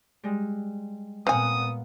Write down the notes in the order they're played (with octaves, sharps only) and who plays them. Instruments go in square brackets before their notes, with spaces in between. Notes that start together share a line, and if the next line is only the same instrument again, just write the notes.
[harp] G3 G#3
[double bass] A#2 B3 [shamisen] C4 G#5 [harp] F5 F#5 [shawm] D#6